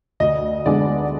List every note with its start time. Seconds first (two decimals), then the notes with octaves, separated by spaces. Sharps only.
0.20 D2 D#5
0.66 D3 G#3 B3 D4 D5